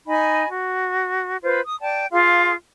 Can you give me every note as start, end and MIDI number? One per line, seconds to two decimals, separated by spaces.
0.07 0.48 63
0.07 0.48 75
0.07 0.48 80
0.07 0.48 83
0.50 1.38 66
1.42 1.60 65
1.42 1.60 71
1.42 1.60 72
1.65 1.79 87
1.81 2.05 74
1.81 2.05 79
1.81 2.05 81
2.11 2.53 65
2.11 2.53 68
2.11 2.53 77
2.11 2.53 84